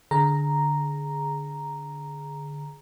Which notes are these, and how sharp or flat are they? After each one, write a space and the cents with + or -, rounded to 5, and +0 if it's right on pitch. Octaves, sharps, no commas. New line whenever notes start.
D3 +0 G#4 +0 A#5 +0